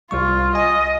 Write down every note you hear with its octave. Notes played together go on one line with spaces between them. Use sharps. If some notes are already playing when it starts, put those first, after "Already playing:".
C2 G3 F4 C#6
D#5 G#5